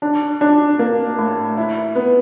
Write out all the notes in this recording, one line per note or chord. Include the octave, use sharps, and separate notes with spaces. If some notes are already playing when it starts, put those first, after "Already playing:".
D4
D4
A#3
A2
E4
B3